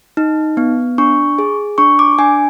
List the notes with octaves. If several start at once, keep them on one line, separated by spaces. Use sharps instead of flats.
D#4
B3
D4 C#6
G#4
D4 C#6
D6
D4 G#5